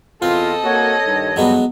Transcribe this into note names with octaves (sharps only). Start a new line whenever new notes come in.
E2 B3 C4 F4 A4 D#5
A#3 F#4 C#5
G2 D#3
G2 F#3 G#3 B3